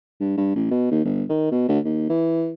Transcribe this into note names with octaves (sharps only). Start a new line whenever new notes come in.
G2
G2
A1
B2
D#2
G1
D#3
B2
D2
D#2
E3